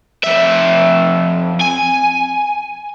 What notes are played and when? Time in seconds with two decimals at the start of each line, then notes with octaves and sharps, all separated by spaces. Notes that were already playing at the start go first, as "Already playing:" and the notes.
0.24 F2 E5
1.61 G#5